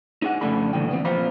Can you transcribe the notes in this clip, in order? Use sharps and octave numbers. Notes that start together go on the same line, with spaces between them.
D#4 G#4 F#5
F2 C#3 A3 D4 A4 B5
C#2 A#2 D3 E3 G5
F3 B3 C4
A#2 F3 C5 F5 A#5 B5